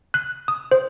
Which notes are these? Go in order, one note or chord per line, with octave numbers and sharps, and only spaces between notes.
F#6
D#6
C5